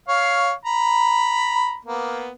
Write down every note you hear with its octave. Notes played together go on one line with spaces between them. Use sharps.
C#5 F5
A#5 B5
A#3 B3